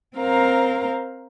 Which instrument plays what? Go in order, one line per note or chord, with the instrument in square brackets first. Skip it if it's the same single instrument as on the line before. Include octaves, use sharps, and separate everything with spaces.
[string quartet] C4 A#4 C5 F5 A#5